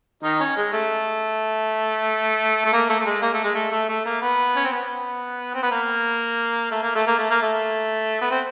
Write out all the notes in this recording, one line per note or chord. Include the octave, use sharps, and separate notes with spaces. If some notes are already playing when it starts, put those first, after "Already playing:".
D#3 D#4
C#4
G#3
A3
A3
A#3
A3
A3
G#3
A#3
A3
G#3
A3
A3
A3
A#3
B3
C#4
C4
B3
C4
B3
A#3
A3
A#3
A3
A#3
A3
A#3
A3
B3
C4